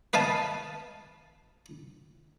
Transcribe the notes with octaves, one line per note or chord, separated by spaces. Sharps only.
B4 D#5 F5 G#5 A5